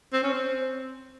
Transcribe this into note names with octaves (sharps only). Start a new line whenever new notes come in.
C4
C#4
C4